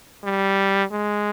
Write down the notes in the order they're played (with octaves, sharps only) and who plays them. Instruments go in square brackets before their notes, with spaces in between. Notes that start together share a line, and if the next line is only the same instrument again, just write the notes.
[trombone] G3
G#3